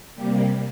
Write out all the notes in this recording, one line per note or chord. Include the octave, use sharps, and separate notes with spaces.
C3 G3 A#3 G4